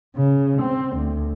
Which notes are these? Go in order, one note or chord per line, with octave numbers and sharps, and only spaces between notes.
C#3
C4
D2